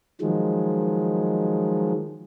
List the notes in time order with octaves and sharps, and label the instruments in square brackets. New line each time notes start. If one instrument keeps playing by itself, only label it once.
[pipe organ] D#3 F3 F#3 G#3